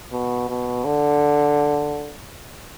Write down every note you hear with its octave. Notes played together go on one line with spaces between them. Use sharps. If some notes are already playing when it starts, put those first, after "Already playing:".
B2
B2
D3